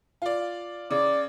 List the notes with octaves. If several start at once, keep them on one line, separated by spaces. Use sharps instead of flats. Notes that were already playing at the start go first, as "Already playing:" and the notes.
F4 D5
C#3 D5